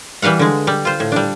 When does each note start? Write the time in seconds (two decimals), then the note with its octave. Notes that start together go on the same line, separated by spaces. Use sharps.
0.22 E3 G3 B4 F5 F#5
0.39 D3 G#3
0.67 G3
0.85 F4 C5
1.00 A2
1.12 G3 D4